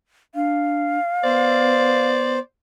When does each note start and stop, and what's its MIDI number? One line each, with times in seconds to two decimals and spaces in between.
0.35 0.98 62
0.35 2.08 77
1.24 2.39 59
1.24 2.39 72
1.24 2.39 74